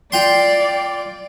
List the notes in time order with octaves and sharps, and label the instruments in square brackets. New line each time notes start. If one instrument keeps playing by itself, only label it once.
[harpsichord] F4 G5 C6 [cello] D5